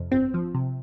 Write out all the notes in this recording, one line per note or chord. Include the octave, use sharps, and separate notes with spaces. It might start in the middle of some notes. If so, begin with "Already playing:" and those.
Already playing: F2 C3
G1 C4
F3
C3